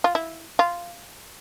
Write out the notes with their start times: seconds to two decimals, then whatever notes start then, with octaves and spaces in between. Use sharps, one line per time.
0.04 F4
0.15 E4
0.59 F4